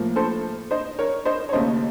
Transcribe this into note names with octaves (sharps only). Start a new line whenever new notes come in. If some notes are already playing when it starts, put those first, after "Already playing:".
Already playing: A2 F3 A#3
A4 C5
C5 D#5
A#4 C#5
C5 D#5
C#5
D#2 C#3 A3 C5 D#5